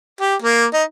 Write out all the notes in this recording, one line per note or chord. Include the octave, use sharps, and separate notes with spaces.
G4
A#3
D#4